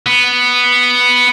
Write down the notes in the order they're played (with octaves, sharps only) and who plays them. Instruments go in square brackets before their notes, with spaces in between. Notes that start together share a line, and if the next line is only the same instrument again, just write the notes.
[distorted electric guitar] B3